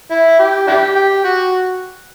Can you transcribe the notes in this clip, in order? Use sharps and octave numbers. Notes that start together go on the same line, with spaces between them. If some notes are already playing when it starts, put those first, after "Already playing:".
E4
G4
D4 E4 G4
G4
F#4